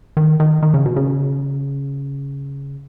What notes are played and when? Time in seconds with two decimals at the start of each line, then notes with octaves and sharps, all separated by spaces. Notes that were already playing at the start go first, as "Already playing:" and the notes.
0.17 D#3
0.40 D#3
0.63 D#3
0.74 C#3
0.86 B2
0.96 C#3